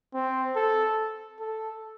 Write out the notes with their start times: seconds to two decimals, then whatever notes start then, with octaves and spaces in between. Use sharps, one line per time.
0.14 C4
0.56 A4
1.40 A4